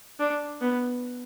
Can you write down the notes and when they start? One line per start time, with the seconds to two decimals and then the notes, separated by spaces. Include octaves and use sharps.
0.19 D4
0.61 B3